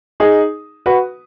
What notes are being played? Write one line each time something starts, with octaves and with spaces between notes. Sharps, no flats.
D#4 G#4
F#4 B4